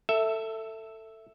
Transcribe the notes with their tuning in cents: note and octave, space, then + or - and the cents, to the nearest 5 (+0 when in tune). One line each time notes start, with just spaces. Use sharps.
A4 +20 E5 +0